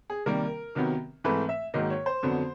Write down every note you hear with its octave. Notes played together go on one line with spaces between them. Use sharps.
G#4
C3 D#3 G3 A#3 A#4
C3 D#3 F#3 B3
G#2 E3 A3 C4 B4
E5
G#2 D#3 F#3 A#3 D#5
C#5
C5
F2 D3 F#3 B3